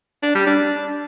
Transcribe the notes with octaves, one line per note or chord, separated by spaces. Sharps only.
D4
G3
D4